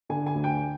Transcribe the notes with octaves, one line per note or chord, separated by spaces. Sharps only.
D3 G#5
G#5
D2
G5